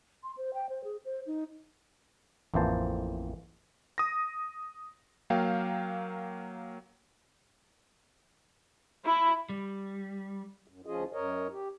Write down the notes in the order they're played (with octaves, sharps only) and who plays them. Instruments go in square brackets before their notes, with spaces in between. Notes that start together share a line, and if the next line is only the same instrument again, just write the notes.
[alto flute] C6
C5
G5
C5
G#4
C5
D#4
[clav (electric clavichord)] A1 F2 E3 A#3 C5 A5
[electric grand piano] D#6 A#6
F#3 A#3 F5 G5
[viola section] E4
[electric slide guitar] G3
[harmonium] F#2
D2 F3 C#4 F4 G#4 D#5
F#2 A#4 C#5 D#5
G4